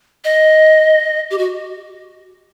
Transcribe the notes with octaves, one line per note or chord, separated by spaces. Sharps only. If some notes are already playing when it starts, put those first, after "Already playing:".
D#5
G4
F#4